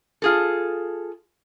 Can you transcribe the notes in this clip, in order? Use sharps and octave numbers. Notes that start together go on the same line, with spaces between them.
F4 G#4 A4